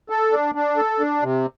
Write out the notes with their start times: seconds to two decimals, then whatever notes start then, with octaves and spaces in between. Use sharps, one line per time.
0.10 A4
0.32 D4
0.55 D4
0.77 A4
1.00 D4
1.22 C3